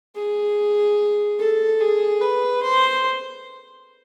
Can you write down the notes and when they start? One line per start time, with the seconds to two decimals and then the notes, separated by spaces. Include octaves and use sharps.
0.15 G#4
1.39 A4
1.81 G#4
2.22 B4
2.63 C5